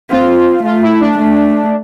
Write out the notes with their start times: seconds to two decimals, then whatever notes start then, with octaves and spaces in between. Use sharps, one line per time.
0.10 C4 F4
0.64 A3 F4
0.82 E4
1.00 D4
1.18 A3